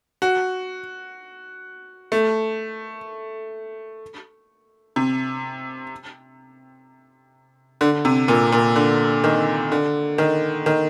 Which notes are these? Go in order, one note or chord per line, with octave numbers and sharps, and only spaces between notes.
F#4
A3
C3
D3
C3
A#2
A#2
D3
D#3
D3
D#3
D#3